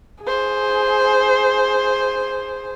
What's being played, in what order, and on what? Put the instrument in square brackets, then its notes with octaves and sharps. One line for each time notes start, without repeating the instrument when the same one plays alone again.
[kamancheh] G#4 C5